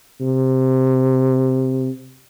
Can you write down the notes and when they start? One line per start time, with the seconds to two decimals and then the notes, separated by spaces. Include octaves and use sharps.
0.21 C3